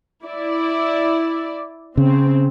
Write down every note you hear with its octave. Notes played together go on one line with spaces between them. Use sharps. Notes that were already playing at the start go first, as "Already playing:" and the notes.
E4 D5
C#3 C4